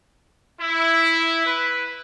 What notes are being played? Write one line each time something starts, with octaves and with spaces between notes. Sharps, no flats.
E4
B4